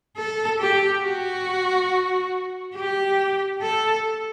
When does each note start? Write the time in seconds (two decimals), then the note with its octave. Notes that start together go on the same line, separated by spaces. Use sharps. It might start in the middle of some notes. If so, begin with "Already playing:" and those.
0.17 A4
0.60 G4
1.03 F#4
2.76 G4
3.62 A4